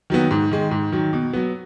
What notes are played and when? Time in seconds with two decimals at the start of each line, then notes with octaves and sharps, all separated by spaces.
0.10 D#3 F#3 B3
0.31 G#2
0.51 D#3 G#3
0.71 G#2
0.92 D#3 F#3
1.13 B2
1.33 F#3 B3